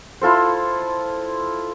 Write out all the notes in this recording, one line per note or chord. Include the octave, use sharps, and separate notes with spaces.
E4 F4 A4 C5